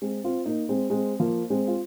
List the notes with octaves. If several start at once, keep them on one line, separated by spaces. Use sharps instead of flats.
G#3 C4
C4 F4
A#3 D#4
G#3 C4
G#3 C4
F3 A#3
G#3 C4
F4